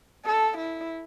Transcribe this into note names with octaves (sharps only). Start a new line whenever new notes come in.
A4
E4